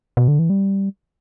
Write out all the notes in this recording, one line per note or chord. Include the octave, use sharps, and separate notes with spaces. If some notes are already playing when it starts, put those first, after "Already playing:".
B2
D3
E3
G3